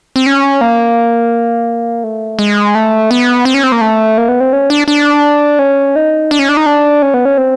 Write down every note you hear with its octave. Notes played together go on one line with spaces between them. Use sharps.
C4
C#4
A#3
A3
G#3
A3
B3
C4
C#4
C4
A#3
A3
A#3
B3
C4
C#4
D4
D4
C#4
D#4
D4
C#4
D4
D#4
D4
C#4
B3
C#4
C4